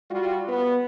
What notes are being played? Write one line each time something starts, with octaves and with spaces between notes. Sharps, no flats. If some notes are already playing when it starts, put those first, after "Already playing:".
G3 F4 F#4
B3